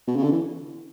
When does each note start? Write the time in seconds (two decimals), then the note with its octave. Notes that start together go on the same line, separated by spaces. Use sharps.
0.08 B2
0.16 C#3
0.23 D3
0.32 E3